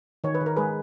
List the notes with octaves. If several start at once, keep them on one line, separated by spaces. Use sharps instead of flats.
D#3 C#5
B4
D#3
A#4
G#3 G#4 B4